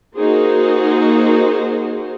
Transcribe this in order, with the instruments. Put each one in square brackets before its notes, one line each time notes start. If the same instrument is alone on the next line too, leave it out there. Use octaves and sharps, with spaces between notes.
[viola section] A#3 D#4 F#4 G#4 C5